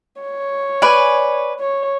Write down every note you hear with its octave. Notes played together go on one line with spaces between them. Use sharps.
C#5
B4 D5 G#5
C#5